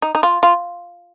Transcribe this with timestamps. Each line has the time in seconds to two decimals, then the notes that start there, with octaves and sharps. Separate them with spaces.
0.02 D#4
0.15 D#4
0.23 F4
0.43 F4